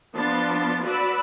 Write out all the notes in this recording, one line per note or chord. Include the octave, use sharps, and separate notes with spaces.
F3 B3 D4 C6 A6
F#4 B4 D5 B5 E6